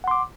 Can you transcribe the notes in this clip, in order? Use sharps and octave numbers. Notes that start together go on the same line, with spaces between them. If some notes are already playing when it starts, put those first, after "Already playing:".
F#5 C6 D6